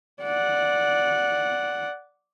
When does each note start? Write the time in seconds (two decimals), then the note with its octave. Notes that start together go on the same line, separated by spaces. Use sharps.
0.21 D5 F#5